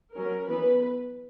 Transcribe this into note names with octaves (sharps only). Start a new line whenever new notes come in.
F#3 C#4 A#4
E3 B3 B4